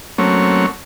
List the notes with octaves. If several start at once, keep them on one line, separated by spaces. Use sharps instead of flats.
F#3 A3 A#3 C4 C#4 C#5